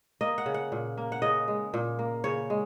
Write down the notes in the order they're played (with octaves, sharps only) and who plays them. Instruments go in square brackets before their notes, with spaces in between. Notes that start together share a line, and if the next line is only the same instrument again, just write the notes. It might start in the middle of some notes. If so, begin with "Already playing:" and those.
[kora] A#3 D#5
F#5
C#3
F#5
A#2
A#3
F#5
C#3 D#5
G#3
A#2
A#3
C#3 C#5
G#3